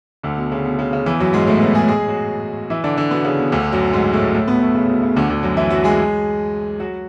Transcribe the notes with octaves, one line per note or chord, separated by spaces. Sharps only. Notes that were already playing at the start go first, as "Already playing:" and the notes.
D2 D3
B2
C#3
B2
C#3
C#3
E2 E3
F#2 F#3
G#2 G#3
A2 A3
B2 B3
G#3 G#4
G#3 G#4
F#3 F#4
E3 E4
D3 D4
D3 D4
B2 B3
C#3
B2
D2 D3
F#2 F#3
G#2 G#3
A2 A3
A2 A3
B2 B3
A2 A3
C#3
B2
C#3
D2 D3
D2 D3
F#2 F#3
E3 E4
F#3 F#4
G#3 G#4
F#3 F#4